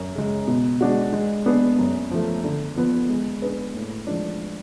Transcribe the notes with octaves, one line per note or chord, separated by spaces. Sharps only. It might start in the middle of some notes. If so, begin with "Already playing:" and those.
Already playing: F#2
C#3 G#3
B2
G#3 D4 F#4
G#3
B3 D4 G#4
F#2
F3 A3
D3
F3 B3 F4
G#3
D4 G#4 B4
A2
F3 G#3 D4